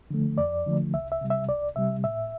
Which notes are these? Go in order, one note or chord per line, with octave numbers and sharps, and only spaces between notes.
D3 F3 A3
F2 D5
D3 F3 A3
C2 E5
E5
C3 G3
E5
C2 D5
C3 G3 E5
A2 E5